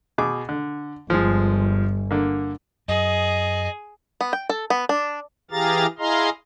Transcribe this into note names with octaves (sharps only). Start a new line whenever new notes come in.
B2 G#4 D6
D3
G1 F3 G#3
D3 A#3
F#2 G#4 D#5
B3
G5
A4
B3
D4
E3 G4 G#4 F5 A#5 A6
E4 G#4 D#5 F5 A#5 C6